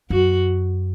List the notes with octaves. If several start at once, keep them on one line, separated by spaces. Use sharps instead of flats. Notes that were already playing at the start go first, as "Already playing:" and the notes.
F#2 F#4